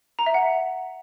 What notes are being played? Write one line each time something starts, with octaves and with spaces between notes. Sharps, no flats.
A#5
E5
F#5